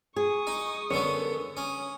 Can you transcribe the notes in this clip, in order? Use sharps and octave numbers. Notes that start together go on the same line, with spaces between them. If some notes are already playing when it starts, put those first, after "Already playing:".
G#4 C#6 D#6
D#4
F#2 D3 B3 C#5
C#4 D#6